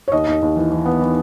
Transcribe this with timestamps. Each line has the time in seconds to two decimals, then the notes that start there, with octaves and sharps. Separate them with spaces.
0.08 C#5
0.12 D#2 D#5
0.27 D#2
0.42 D#2
0.56 E3
0.72 E3
0.86 B3
1.01 E3